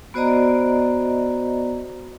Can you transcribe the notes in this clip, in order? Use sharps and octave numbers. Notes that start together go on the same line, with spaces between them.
B3 F#4 C5 D5 D#5 A#5